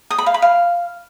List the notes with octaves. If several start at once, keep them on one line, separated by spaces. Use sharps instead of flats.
D#6
B5
F5
B5
F5